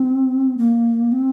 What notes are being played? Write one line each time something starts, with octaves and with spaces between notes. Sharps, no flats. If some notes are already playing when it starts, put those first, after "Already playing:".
Already playing: C4
A#3
C4